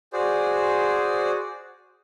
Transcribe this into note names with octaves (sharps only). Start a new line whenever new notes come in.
F#4 G#4 C5 D5